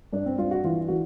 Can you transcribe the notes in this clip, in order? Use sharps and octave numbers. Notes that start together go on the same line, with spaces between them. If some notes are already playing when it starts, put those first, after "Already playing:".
G2 D4
C4
G2 F4
F#4
E3 F4
E3 F#4